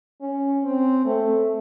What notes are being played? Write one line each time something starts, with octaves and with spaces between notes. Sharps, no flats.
C#4
C4
A3